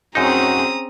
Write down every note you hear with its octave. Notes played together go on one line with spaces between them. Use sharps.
F#2 C4 C#4 D#4 F#4 G#4 A#5 D#6